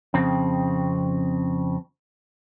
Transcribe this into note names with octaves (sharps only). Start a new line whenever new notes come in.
F2 C#3 C4